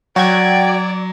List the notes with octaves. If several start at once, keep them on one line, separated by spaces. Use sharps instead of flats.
F#3 F#4 D5 G5 G#6